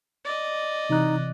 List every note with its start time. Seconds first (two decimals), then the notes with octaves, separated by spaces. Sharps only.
0.25 D5 D#5
0.90 C3 E3 D#4 F#6